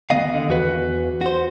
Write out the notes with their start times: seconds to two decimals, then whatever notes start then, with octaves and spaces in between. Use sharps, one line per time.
0.10 D2 G#2 D#3 B3 D#5 F5
0.34 D3
0.49 E2 F#4 B4
1.21 F#4 C5